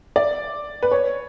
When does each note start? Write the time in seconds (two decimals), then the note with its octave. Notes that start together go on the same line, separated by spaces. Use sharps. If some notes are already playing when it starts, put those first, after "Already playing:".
0.16 D5
0.83 B4
0.91 C#5